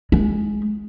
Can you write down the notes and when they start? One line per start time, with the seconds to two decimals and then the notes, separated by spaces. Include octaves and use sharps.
0.12 G#3